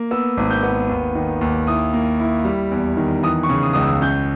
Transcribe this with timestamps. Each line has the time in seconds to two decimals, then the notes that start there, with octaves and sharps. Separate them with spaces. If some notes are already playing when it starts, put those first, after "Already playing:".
Already playing: A#3
0.11 B3 E6
0.37 G#1
0.50 G6
0.63 B3
0.89 D#2
1.15 D#3
1.41 D#2
1.67 E4 D#6
1.94 A#3
2.19 E4
2.45 G3
2.71 E2
2.97 D#3
3.23 E3 D#6
3.43 C#6
3.49 C#3
3.63 D#6
3.73 C#2 D#6
3.81 E6
4.01 C#4 G6